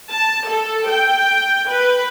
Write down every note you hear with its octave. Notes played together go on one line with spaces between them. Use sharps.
A5
A4
G5
B4